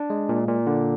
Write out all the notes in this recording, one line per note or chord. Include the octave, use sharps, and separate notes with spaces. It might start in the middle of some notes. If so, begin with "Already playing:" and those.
Already playing: D4
G#3
A#2
A#2
D3